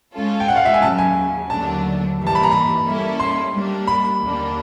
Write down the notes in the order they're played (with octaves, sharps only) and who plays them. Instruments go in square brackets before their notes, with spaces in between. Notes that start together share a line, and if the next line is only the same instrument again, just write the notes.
[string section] G#3 C#4 F4 A4
[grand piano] G5
F#5
F5
E5
G#5
[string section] D#2 C#3 F#3 [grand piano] A5
[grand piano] G#5
[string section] D#2 D3 F#3 A3 D4 [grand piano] A5
[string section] G2 E3 G3 A#3
[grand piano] A5
B5
A#5
B5
[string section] G3 A#3 C#4 E4 A4
[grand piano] C6
[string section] G3 A#3 D4
[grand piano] B5
[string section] D#2 D3 G3 A#3 D4